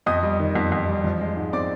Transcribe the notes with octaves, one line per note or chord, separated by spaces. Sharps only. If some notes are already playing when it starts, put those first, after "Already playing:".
F2 D#5 D#6
G3
D#3
F2
F2
G3
F3
G#3
G#2
C4 D5 D6